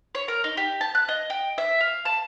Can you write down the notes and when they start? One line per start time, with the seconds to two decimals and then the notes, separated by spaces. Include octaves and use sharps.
0.15 C#5
0.28 A#4
0.44 D#4
0.57 G4
0.81 A5
0.95 F#6
1.09 D#5
1.30 G5
1.58 E5
1.81 F5
2.05 A5